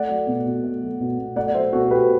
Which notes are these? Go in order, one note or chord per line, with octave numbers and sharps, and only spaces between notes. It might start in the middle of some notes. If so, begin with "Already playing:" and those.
Already playing: A3 D5 F#5
F#3
B2
B2
A3
F#3
B2
B2
A3 D5 F#5
F#3 C5 E5
B2 F#4 A4
A4
B2 G4 B4